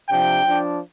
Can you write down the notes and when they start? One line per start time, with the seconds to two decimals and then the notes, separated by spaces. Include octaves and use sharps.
0.08 C3 F3 D4 G5
0.44 F3 D4